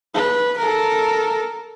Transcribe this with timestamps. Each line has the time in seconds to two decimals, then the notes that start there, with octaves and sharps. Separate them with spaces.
0.14 B4
0.58 A4 A#4